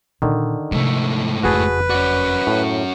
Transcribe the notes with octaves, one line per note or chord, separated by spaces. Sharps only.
A#2 D3 D#3 C4
G#2 C3 F3 A3
F#1 F2 F#4 G#4 B4 A5
C#4 F#4 D5
A2